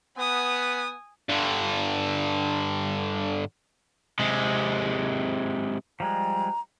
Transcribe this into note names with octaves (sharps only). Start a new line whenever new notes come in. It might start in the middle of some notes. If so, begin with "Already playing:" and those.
B3 G#5 D#6
G2 D3
C3 G#3
F3 G3 G#3 A#5